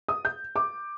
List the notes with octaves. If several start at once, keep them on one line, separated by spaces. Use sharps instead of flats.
D#6
G6
D6